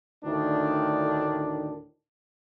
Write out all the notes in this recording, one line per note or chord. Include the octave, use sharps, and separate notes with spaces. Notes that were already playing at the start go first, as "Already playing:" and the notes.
D2 A2 D#3 D4